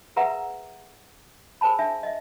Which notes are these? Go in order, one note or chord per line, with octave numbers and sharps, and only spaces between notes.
G#4 A#4 B4 E5 F#5 A#5
G#4 A#4 C5 G#5 A5 B5
D4 E5 G#5
D#5 E5